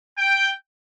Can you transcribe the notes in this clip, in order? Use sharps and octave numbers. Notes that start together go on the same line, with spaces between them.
G5